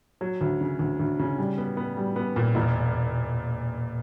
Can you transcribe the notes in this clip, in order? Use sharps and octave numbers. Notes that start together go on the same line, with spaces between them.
F#3
D2
C#3
D2
D2
C#3
G3
B3
B3
G3
B3
A#2
E1